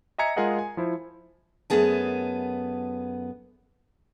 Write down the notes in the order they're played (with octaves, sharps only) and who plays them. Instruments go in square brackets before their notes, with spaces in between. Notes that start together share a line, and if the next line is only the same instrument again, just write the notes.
[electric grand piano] D#5 E5 G#5 A#5 G#6 C#7
G#3 F4 G#4 A#4 D#5 F#5
G#5
F3 E4 C5
[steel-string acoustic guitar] F#2 C#3 A3 B3 G#4 A5